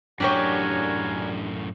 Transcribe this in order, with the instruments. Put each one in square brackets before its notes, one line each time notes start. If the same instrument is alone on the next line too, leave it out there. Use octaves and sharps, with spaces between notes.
[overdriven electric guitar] F#2 A2 [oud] D4 G4 C#5 [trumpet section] F#4 A#4 G#5